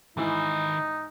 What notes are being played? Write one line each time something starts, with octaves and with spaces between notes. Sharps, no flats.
G#2 D#3 E3 D#4 B5